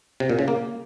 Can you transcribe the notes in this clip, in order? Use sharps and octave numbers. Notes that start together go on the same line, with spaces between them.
C3
A#2
C#3
A#3